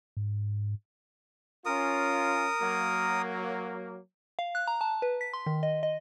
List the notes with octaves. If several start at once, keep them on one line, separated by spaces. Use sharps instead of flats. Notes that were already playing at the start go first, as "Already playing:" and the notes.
G#2
C#4 F4 A#4 D#6
F#3 A#3
F5
F#6
A#5
A5
B4
B6
C6
D#3
D#5
D#5